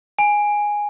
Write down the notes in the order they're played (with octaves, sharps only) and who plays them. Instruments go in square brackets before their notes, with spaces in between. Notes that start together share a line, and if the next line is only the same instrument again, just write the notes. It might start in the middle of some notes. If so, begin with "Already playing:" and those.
[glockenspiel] G#5